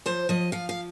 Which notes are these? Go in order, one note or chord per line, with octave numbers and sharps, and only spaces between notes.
F3 C5
F3 D#5
F3 F5
F5